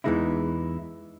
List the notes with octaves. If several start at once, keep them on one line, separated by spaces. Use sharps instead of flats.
E2 G2 E3 G#3 D#4 E4